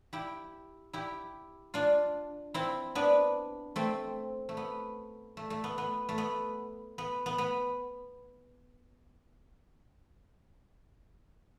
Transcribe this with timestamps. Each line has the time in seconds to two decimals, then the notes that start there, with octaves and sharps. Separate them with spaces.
0.13 E4 G4
0.93 E4 G4
1.74 D4 F4
2.54 C4 E4
2.95 B3 D4
3.76 A3 C4
4.49 A3
4.57 B3
5.37 A3
5.50 A3
5.64 B3
5.78 B3
6.09 A3
6.18 B3
6.98 B3
7.26 B3
7.38 B3